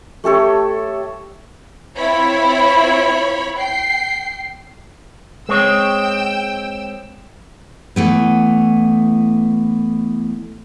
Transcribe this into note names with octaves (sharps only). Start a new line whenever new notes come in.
A3 G4 A4 C#5
C4 E4 F4 C#5 B5
G5 C7
G#3 C4 C#5 G5 E6
E3 A3 B3